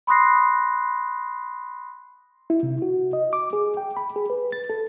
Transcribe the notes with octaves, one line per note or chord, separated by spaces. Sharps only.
B5 C6 D#6 F#6 A#6 C7
E4
C3
F#4
D#5
D6
G#4
G5
B5
G#4
B4
A6
A4